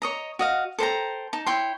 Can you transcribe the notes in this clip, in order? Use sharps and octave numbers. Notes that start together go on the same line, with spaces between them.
C#5 D#5 A#5
F#4 D#5 F5
A4 C5 G5 A#5
D#4 A5
E4 C#5 G5 C6